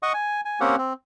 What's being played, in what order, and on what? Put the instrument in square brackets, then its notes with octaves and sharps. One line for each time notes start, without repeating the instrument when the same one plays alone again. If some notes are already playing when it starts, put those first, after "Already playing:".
[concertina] D#5 F#5 C#6 D#6
G#5
G#5
A#3 C4 C#4 G4 F#5
C4